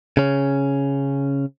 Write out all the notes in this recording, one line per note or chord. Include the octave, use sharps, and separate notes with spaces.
C#3 C#4